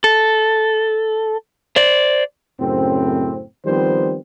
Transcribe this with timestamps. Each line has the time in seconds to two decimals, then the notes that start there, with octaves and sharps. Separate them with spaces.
0.04 A4
1.76 C5 D5
2.60 F#2 A2 C#3 C4
3.66 D#3 F3 G3 B3 C4 C5